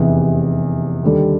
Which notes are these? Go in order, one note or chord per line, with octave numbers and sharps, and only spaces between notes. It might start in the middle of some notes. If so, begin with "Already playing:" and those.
Already playing: F1 E2 C3 E3
D#2 D3 G3